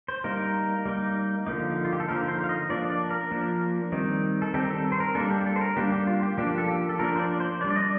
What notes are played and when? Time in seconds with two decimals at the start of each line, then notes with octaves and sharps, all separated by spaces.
0.08 C5
0.24 G3 A#3 D#4 A#4
0.85 G3 A#3 D#4
1.46 D3 F3 A#3 D#4
1.85 F4
1.93 G4
2.00 A4
2.08 D3 F3 A#3 D#4 A#4
2.28 C5
2.44 F5
2.49 D#5
2.69 F3 A#3 D4 D5
2.90 D5
3.10 A#4
3.31 F3 A#3 D4
3.92 D#3 G3 C4 D#4
4.42 A4
4.54 D#3 G3 C4 D#4 G4
4.69 A4
4.92 C5
5.00 A#4
5.15 G3 A#3 D4 A4
5.30 G4
5.46 A4
5.56 C5
5.61 A#4
5.77 G3 A#3 D4 G4
5.92 G4
6.07 F4
6.23 G4
6.37 F3 A#3 D4 G4
6.58 A4
6.68 G4
6.89 A4
6.99 F3 A#3 D4 A#4
7.16 C5
7.19 D5
7.40 C5
7.60 D4 D5
7.64 G3
7.70 D5
7.76 D#5